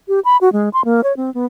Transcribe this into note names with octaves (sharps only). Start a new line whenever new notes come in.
G4
B5
F#4
G#3
C6
A#3
C#5
C4
B3